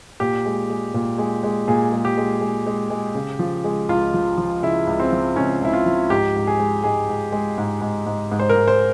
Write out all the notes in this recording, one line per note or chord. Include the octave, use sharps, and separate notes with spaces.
A#2 G4
G#3
G#3
A#2
G#3
G#3
A#2 G#4
G#3
G4
G#3
G#3
G#3
G#3
C#3
F3
G#3
C#2 F4
F3
F3
C#3 E4
C#2
C4
F3
C#2 C#4
C#2 E4
F4
F3
G#2 G4
G#2
G#4
G#3
G#2 G#4
G#2
G#3
G#2
G#2
G#2
G#2
C5
A#4
G#2
C5